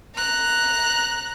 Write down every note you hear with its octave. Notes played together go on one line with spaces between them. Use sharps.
A#5 F#6